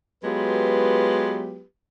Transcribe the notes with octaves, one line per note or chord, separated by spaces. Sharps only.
F#3 G#3 B3 F4 G4 B4